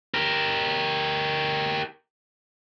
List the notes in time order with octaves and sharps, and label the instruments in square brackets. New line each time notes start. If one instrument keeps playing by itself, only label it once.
[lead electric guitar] G4 A#4